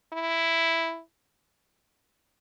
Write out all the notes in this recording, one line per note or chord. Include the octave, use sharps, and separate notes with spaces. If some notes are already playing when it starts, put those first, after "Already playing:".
E4